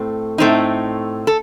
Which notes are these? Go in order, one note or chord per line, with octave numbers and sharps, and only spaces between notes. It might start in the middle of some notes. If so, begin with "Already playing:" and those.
Already playing: A2 A3 C4
A2 A3 C4 D#4
A4